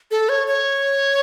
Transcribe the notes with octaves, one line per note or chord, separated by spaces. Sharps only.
A4
C#5
C#5